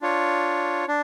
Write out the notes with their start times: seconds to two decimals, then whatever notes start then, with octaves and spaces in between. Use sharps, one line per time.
0.01 D4 F4 C#5
0.88 D4